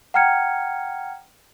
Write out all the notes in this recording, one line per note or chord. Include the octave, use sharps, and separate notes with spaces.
F#5 G5 A#5 F6 G#6 C#7